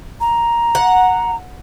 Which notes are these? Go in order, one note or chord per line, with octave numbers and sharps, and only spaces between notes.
A#5
F#5